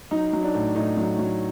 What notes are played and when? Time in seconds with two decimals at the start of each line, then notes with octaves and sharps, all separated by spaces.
0.11 F#3 D#4
0.33 F#3
0.44 D4
0.54 A2
0.75 A2 D#4
0.97 F#3
1.19 F#3